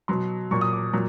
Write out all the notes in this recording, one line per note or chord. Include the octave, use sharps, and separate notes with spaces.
B2 F#3 C6
A#2 F#3 C#6
D#6
D6
A#2 F#3